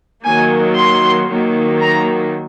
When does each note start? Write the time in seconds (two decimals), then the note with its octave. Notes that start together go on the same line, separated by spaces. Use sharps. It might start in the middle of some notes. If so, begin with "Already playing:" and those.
0.23 D#3 F#3 A#3 G#5
0.76 C6
1.28 D#3 F#3 A#3
1.80 A#5